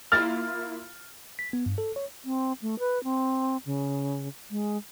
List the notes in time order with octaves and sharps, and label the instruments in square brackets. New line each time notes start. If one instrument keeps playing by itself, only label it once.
[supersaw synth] A#3 E4 F4 [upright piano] F6 A6
[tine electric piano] B6
B3
G2
A4
C#5
[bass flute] C4
A3
B4
C4
C#3
G#3